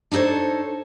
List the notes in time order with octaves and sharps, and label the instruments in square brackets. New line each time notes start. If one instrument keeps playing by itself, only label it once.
[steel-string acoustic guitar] D4 D#4 A4 C5 C#5